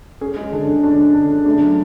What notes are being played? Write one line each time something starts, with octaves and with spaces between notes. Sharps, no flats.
C#4 G#4
G#3
D3 D4
D3
C#4 D4
G#3
D3 D4
D3
A3 D4
F#3